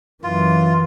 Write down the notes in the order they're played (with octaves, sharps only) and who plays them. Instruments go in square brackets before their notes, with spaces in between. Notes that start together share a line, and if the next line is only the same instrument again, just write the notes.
[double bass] F#2 E3 [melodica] F4